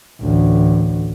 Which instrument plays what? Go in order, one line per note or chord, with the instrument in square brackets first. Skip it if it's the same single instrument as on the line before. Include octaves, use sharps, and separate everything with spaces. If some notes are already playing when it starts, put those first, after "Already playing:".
[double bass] A1 D2